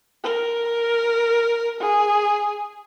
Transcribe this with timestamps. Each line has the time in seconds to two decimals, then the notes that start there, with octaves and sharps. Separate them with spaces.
0.23 A#4
1.80 G#4